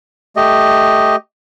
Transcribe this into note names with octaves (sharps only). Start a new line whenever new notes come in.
A3 G4 D#5